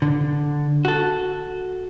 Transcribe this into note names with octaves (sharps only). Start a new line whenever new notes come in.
D3
F#4 A4